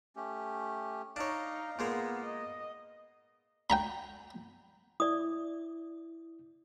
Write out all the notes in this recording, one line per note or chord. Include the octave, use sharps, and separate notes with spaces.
A3 C#4 G4
D4 D#4 C#5 F5 A#5
A#2 G#3 A#3 B3
D#5
G5 A#5 B5
E4 D5 D#6